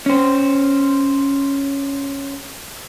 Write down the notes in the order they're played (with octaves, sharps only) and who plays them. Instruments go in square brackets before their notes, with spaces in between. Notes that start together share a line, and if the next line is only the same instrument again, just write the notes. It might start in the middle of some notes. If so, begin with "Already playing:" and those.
[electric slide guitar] C#4 C5